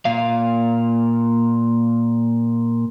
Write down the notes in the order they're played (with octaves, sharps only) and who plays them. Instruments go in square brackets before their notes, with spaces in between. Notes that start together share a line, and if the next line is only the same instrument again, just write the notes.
[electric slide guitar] A#2 F5